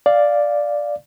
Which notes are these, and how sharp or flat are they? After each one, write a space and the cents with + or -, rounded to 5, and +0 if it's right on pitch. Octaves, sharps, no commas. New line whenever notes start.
D5 +0 F5 +0